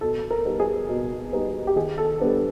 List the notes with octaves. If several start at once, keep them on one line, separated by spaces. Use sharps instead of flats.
B2 A4
A#4
G3 B3 D#4
G#4
B2
G3 B3 D#4
G4
D#3 G#4
A4
G3 B3 D4 A4